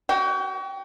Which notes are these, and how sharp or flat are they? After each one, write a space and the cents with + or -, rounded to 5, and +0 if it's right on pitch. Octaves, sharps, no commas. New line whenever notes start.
F#4 +35 G5 +0